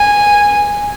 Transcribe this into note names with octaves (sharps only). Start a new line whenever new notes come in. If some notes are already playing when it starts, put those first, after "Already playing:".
Already playing: G#5